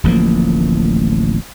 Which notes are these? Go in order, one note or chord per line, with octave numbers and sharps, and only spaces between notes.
D1 A1 F3 A#3